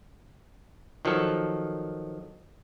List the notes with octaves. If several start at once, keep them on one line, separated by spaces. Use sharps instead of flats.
D#3 F3 F#3 A4